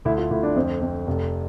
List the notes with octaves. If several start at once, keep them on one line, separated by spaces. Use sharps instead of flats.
D2 E4
F4
D2 E4
D4
F2 C4
F2
F1